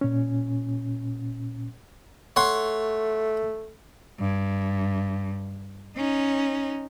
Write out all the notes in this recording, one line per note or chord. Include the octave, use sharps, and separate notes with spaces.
A#2 C#4
A3 C#5 F#5 C6
G2
C#4 D#4